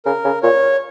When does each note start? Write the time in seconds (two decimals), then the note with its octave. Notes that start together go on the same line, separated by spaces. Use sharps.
0.05 C#3 A#4
0.25 C#3
0.43 A#2 C#5